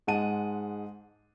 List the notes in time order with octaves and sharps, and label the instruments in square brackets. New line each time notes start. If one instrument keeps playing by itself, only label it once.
[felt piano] G#2 G#3 F#5 A5 D#7